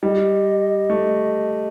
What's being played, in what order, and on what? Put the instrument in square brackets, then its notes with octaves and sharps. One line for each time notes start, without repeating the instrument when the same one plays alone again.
[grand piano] G3 [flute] D#5
[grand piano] A3